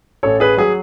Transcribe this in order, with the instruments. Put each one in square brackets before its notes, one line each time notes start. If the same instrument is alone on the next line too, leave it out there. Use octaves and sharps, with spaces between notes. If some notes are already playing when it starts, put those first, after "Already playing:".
[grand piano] A1 A4 C#5
G#4 B4
F#3 G#4